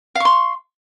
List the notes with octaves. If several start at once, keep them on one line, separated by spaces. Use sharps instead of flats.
F5 C6 C#6